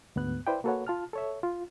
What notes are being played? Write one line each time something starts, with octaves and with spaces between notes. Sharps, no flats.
D2 G#2 B3 F#6
E4 B4 C5 D5 E5 G5
A#3 F#4 A4 B4 C#5 F#5
F4 A5 F6
A4 C#5 E5
F4